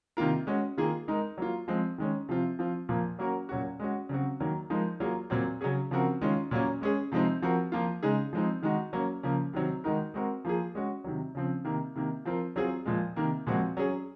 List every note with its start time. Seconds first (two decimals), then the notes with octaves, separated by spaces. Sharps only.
0.17 C3 D#3 A#3 F4 A#4
0.47 G#3 C#4 F#4
0.77 D#3 A#3 F4 G#4
1.08 G#3 D#4 A#4
1.37 F#3 A#3 F4
1.68 F3 G#3 C4
1.98 D#3 G#3 C#4
2.29 C3 F3 C4 F4
2.59 F3 C4 F4
2.89 A#2 F3 A#3
3.19 F#3 A#3 C#4 F#4 A#4
3.49 A#2 F#3 C#4 F#4
3.79 G#3 C#4 F#4
4.09 C#3 F#3 C4 F#4
4.40 D#3 F#3 A#3
4.70 F3 G#3 D#4 A#4
5.00 F#3 A#3 F4 G#4
5.30 A#2 F#3 C4
5.61 C#3 F#3 C#4 G#4
5.91 C#3 F3 C4 F#4 A#4
6.21 D#3 G#3 C#4 F4
6.51 A#2 F#3 A#3 C#4
6.81 G#3 C#4 G#4
7.12 C3 F3 G#3 C4 D#4
7.42 F3 C4 F#4 A#4
7.72 F3 A#3 F4
8.03 C#3 G#3 D#4 G#4
8.33 F3 G#3 C4 D#4
8.62 D#3 G#3 D#4 F#4
8.93 F#3 A#3 C#4
9.23 C#3 F3 A#3
9.53 C3 D#3 F#3 C4
9.84 D#3 G#3 D#4 F#4 A#4
10.14 G#3 C4 F#4 A#4
10.45 F3 A#3 F4 G#4
10.75 G#3 C#4 F#4
11.04 C3 D#3 F#3
11.35 C#3 F3 C4
11.65 C3 D#3 A#3
11.95 C3 D#3 A#3
12.25 F3 C4 F4 A#4
12.56 F#3 C4 F4 G#4
12.85 A#2 F3 G#3
13.16 C3 D#3 A#3
13.47 A#2 F3 G#3 C4 F#4
13.77 F#3 C#4 G#4